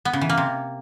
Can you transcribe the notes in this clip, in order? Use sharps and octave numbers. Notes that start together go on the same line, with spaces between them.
B3
C#3
E3
A#3
C3